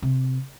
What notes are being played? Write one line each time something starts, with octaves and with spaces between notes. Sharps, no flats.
C3